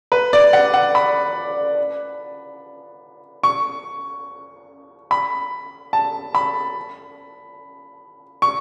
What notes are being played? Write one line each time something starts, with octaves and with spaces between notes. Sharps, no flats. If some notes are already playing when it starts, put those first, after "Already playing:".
B4
D5
F#5
F#5
B5
C#6
B5
A5
B5
C#6